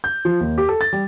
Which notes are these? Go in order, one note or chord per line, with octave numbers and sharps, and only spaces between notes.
G6
F3
D#2
G4
A4
A6
G3